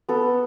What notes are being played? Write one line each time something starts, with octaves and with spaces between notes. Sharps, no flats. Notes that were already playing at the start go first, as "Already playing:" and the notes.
B3 A4